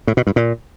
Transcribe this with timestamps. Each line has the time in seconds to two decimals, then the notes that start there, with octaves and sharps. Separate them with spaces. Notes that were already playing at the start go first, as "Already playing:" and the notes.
0.07 A2
0.17 B2
0.27 G2
0.36 A#2